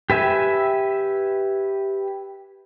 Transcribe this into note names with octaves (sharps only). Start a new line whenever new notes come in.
G4 B4 E5 G#5